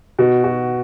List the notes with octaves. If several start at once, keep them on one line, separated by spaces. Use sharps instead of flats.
B2 F#4
F#4